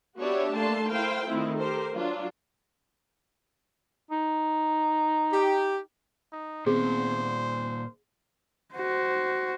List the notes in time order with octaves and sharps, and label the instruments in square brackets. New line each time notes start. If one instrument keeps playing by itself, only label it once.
[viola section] B3 D4 F#4 G4 C#5 E5
A3 A#3 D4 A5 C6
E4 A#4 C5 F5 G5
D#3 A3 C4 E4 F4
G4 A4 A#4 C5
F#3 D4 F4
[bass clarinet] D#4
[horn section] G4
[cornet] D#4
[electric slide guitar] A#2 D#3 [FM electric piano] B3 C4 [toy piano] G#4 [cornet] C5
[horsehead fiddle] F#4 C5